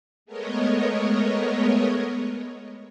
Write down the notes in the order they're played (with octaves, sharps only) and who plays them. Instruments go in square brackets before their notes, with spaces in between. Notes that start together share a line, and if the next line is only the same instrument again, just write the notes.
[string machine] G#3 A3 B3 A#4 C#5 D#5